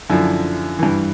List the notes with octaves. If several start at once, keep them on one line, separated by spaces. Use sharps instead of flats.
F#2 D3 F3 E4
G2 E3